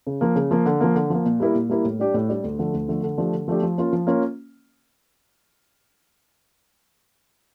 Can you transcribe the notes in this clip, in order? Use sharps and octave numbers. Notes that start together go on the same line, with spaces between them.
C#3
F3 A#3
C#3
F3 A#3
D3
F3 A#3
D3
F3 A#3
A#2
G3 A#3 E4 A#4
A#2
G3 A#3 E4 A#4
A2
G3 D4 G4 D5
A2
G3 D4 G4 D5
D2
D3 F3 A3
D2
D3 F3 A3
D3
F3 A3 D4 G4
D3
F3 A3 D4 G4
F3
A#3 C#4 F4
F3
A#3 C#4 F4